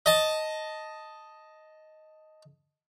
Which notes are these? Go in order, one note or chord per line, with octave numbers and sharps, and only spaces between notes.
D#5 A5